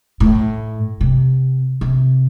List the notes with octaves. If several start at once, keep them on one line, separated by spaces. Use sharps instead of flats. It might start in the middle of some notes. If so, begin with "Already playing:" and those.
A2
C3
C3